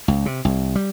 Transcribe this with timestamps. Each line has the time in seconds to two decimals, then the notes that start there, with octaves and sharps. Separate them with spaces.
0.08 C#2
0.26 C3
0.45 C2
0.76 G3